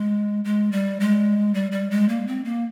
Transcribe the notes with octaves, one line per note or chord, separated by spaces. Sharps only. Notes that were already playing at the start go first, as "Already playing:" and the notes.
Already playing: G#3
G#3
G3
G#3
G3
G3
G#3
A#3
C4
A#3